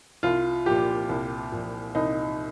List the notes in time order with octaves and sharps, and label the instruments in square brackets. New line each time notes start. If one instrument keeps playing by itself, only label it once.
[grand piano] C2 F4
A#2 F3 G4
C2
A#2 F3
C2 D#4